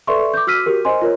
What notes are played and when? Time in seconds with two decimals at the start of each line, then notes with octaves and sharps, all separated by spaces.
0.07 A4 B4 D5 E5 C6 C#6
0.34 D6 G6
0.47 F#4 E6 F6 B6 D#7
0.66 F#4 G4 A#4
0.85 C5 D#5 G#5 C6
1.02 F4 A#4 C#5